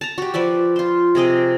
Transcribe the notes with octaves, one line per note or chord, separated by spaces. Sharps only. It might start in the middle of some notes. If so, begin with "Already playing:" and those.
A5 A#5
F#4 G4
F3 B4 D5 E5
F4 C5
C3 G#4 D#5 D6